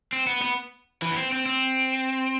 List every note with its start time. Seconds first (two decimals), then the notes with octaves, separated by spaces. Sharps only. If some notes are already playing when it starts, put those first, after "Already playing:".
0.13 C4
0.27 B3
0.42 B3
1.02 E3
1.11 B3
1.17 C4
1.32 C4
1.46 C4